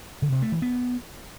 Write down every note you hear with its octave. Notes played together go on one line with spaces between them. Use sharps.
D3
C3
A3
E3
B3